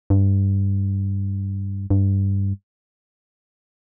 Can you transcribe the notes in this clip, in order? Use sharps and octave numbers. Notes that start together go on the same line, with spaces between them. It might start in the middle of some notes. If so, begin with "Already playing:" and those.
G2
G2